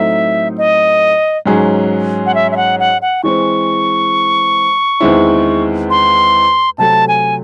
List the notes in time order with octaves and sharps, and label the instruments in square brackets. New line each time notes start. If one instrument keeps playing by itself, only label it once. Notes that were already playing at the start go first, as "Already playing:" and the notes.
Already playing: [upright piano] A2 F#3 A3 C4 D#4 [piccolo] E5
[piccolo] D#5
[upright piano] G#2 F#3 C#4 G#4 C#5
[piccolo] F#5
E5
E5
F#5
F#5
F#5
[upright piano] E3 G#3 C4 [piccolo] C#6
[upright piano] E2 D#3 G#3 C4 E4
[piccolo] C6
[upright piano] C3 F#3 A3 [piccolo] A5
[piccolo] G#5